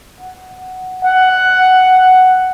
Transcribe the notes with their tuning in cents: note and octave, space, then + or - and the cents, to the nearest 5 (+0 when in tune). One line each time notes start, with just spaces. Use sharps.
F#5 +5
F#5 +5